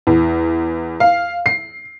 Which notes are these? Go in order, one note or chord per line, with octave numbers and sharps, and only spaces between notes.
E2
F5
C7